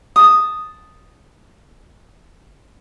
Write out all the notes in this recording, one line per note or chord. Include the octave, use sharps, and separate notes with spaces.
A5 D#6